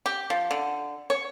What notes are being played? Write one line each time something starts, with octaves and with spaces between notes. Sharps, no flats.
G4
F3
D3
C#5